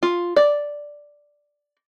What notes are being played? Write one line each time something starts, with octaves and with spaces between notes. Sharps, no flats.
F4
D5